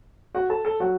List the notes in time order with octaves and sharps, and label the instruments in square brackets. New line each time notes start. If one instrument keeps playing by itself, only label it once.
[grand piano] F#4 F#5
A4 A5
A4 A5
F#3 F#4 F#5